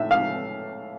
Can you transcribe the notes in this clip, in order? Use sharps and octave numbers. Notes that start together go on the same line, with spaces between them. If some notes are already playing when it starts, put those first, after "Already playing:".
Already playing: A2 E5
F5